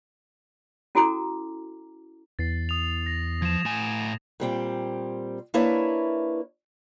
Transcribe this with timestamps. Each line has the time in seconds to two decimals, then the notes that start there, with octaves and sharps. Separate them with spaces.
0.95 C#4 E4 F#4 A4 A#5 D6
2.39 E2 A6 C7
2.69 D#6 F7
3.06 A#6
3.42 F3 G#6 E7
3.65 A2 G#5
4.40 A#2 G3 C4
5.54 A#3 D4 E4 B4 C#5